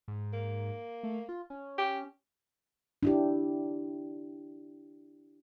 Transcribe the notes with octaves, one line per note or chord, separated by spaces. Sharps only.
G#2
A#3
A3
F4
C#4
G4
D4 E4 G4